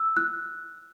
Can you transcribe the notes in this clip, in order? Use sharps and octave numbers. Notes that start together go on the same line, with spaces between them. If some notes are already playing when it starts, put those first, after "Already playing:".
Already playing: E6
F#6